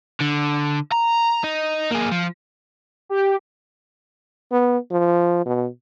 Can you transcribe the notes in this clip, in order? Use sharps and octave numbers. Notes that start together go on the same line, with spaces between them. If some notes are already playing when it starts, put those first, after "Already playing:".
D3
A#5
D#4
A#3 G#4
F3
G4
B3
F3
B2